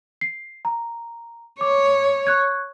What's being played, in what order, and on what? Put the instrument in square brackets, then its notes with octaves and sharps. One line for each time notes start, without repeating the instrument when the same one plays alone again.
[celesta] C7
A#5
[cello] C#5 [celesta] D6
[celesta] C#6 F#6 G#6